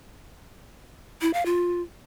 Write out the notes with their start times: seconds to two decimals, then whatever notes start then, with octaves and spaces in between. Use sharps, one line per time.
1.22 E4
1.34 F5
1.46 F4